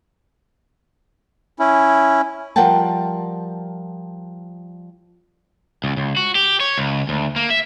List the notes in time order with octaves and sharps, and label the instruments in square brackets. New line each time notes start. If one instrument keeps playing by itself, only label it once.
[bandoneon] C#4 E4
[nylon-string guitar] F3 G3 A#4 F#5 G5 A5
[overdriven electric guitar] C#2
C#2
F#4
G4
C#5
C#2
D2
A#3
E5